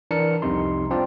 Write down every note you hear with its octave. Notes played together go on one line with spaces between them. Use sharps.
E3 D4 A#4 A5 C#7
C2 F2 C3 D#4 C6
C4 D4 F4 D5